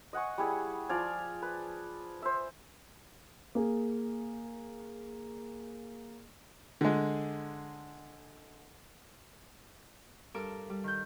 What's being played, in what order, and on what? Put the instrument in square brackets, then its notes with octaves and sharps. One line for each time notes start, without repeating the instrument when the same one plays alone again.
[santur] D#5 F#5 G#5 C#6
G3 E4 G#4 F#5
F3 D5 F5 G#5
B4
C5 E5
[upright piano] A#3 G#4
[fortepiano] D3 G#3
[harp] G2 A4 A#4 D6 E6
G3
D#3 G6